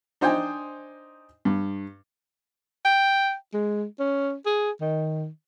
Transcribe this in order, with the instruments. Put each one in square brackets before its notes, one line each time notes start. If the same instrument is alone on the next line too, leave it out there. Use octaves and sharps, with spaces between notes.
[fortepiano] D4 D#4 C5 D#5 G5 G#5
G2
[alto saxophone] G5
G#3
C#4
G#4
D#3